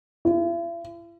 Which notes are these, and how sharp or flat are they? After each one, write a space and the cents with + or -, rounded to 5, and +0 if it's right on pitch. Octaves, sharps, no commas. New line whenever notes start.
E4 +45